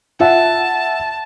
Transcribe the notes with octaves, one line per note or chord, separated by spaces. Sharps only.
F4 E5 F#5 A5